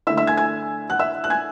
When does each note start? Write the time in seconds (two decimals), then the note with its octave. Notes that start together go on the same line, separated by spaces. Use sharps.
0.07 D3 A3 E4 E5 E6
0.17 E5 E6
0.27 G#5 G#6
0.37 G#5 G#6
0.90 F#5 F#6
0.99 E5 E6
1.24 F#6
1.30 G#5 G#6